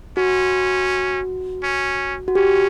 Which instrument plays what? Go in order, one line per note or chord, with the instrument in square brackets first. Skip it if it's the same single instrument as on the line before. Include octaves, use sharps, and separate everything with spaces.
[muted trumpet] C#4 [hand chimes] F#4
[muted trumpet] C#4
[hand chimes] F#4
[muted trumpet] C#4 [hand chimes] G4